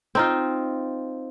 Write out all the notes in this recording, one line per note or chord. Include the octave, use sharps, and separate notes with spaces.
C4 D#4 F4